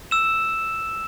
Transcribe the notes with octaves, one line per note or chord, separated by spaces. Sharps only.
E6 E7